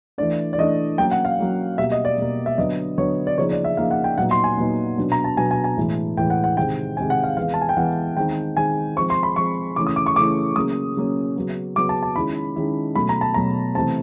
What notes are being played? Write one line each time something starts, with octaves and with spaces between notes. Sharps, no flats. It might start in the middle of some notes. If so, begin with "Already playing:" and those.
E3 A3 D4 D5
D5
E3 A3 D4 D#5
F#3 A#3 C#4 G5
F#5
F5
F#3 A#3 C#4
B2 G3 A#3 E5
D#5
D5
B2 G3 A#3
E5
D3 F#3 B3 D4 D#5
D3 F#3 B3 D4 C#5
D5
C#3 F3 A#3 D#4 C#5
D5
E5
C#3 F3 A#3 D#4 F5
F#5
G5
A#2 F#3 B3 D#4 F#5
C6
G#5
A#2 F#3 B3 D#4
B2 F#3 B3 D4
A#5
A5
B2 F#3 B3 D4 G#5
G#5
G#5
A2 E3 G#3
A2 E3 G#3 G5
F#5
F#5
C3 D#3 G#3 C4 G5
C3 D#3 G#3 C4 G#5
F#5
F5
E3 G#3 B3 F5
A5
G#5
G5
E3 G#3 B3 F#5
D#3 G#3 C4 G5
D#3 G#3 C4 G#5
F3 G#3 C4 C#6
C6
B5
F3 G#3 C4 C#6
C#3 E3 A3 C#4 E4 D6
D#6
D6
C#6
C#3 E3 A3 C#4 E4 D6
C#3 F#3 A#3 C#4 D#6
C#3 F#3 A#3 C#4
C#3 F#3 B3
C#3 F#3 B3 D6
A5
A5
D#3 G#3 C#4 E4 B5
D#3 G#3 C#4 E4
B2 F#3 A3 B5
A#5
A5
B2 F#3 A3 A#5
C3 E3 A3 C4 A5